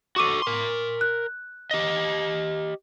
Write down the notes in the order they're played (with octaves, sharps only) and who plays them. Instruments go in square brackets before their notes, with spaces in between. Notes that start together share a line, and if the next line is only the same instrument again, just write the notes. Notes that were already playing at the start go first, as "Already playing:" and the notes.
[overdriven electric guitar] F#4 A4 [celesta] C#6 D6 D#7
[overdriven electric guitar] A#4 C6
[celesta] F#6
[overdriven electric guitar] G4 D#5